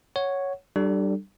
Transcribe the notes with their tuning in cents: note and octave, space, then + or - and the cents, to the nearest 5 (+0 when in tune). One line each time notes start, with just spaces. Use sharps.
C#5 +0 F#5 +0
G3 -20 D4 +25 A4 +0